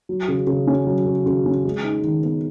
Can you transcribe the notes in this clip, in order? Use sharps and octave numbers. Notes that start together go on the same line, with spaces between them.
F#3
C#3
C#3
C#4
F#3
C#3
C#3
C#4
G#3
D#4
D#3
B3